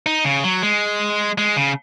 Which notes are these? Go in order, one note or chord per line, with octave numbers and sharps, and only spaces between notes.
D#4
C#3
F#3
G#3
G#3
C#3